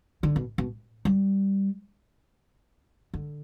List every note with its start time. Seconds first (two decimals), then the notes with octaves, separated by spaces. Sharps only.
0.23 D3
0.36 B2
0.58 B2
1.05 G3
3.14 D3